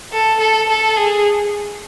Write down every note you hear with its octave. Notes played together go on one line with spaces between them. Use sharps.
A4
A4
A4
G#4